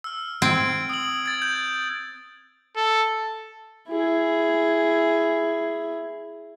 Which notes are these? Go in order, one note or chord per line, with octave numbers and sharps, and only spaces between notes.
E6 F6
C4 G#6 D7
D#6 F#7
G#6 A6
G6
A4
E4 G#4